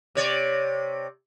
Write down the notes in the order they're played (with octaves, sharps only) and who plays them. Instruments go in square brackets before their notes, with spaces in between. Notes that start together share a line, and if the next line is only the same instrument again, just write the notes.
[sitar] C3 C#5 D5